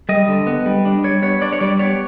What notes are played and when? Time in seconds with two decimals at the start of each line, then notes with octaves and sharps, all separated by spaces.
0.09 G3 D#5
0.28 D3
0.47 B3
0.66 G3
0.85 D4
1.04 G3 C#5
1.22 B3 C#5
1.42 D4 D5
1.52 C#5
1.60 G3 D5
1.79 B3 C#5